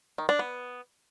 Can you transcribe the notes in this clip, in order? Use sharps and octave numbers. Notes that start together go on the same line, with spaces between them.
D#3
D4
B3